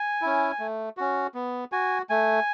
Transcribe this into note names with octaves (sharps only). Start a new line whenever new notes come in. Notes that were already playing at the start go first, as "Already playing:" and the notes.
Already playing: G#5
C#4 E4
A3
C#4 F#4
B3
F#4 G#5
A3 G#5